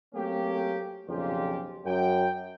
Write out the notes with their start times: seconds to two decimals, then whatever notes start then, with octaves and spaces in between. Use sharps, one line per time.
0.15 F#3 A3 A#3 C4 C#4 G4
1.08 B1 F2 A#2 C#3 F4 G4
1.85 F#2 G5